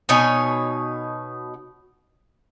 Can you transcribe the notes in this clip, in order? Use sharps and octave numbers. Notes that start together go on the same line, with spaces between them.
B2 D#4 C#5 G#5